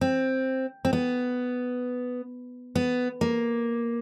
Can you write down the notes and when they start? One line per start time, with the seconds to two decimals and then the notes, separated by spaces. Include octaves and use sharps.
0.01 C4
0.85 C4
0.93 B3
2.75 B3
3.21 A#3